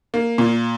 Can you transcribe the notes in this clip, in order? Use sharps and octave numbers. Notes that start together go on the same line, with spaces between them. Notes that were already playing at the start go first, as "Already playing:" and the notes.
A#3
A#2